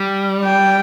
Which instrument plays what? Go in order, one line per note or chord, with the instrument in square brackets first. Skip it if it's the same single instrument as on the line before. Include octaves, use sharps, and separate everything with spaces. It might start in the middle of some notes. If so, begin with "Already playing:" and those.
Already playing: [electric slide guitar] G3
[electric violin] G5